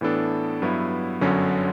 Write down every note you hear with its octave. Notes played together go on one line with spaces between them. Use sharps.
A2 E3 B3 D4 A4
G2 F#3 B3 E4
G1 F#2 D3 F#3 C#4